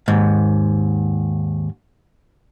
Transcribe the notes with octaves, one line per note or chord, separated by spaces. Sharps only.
D#2 G#2